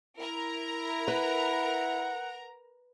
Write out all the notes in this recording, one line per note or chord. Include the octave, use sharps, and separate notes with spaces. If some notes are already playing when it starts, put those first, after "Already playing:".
E4 A#4 A#5
B4 F#5